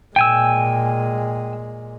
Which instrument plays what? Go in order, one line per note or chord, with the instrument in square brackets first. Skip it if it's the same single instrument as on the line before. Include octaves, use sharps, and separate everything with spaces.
[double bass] A#2 G#3 [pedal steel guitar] G5 G#5 E6